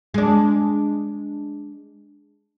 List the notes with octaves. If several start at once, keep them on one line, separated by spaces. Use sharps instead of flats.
G#3 D4